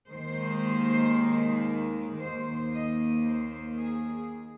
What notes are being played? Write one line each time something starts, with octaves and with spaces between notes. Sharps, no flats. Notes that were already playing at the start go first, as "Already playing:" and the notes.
D#2 D#3 G#3 C5
D#2 D#3 A#3 C5
D#5
C5
G#4